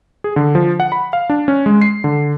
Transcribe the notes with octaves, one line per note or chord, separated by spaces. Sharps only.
G#4
D3
F3
F#5
B5
F5
D4
C#4
G#3
C7
D3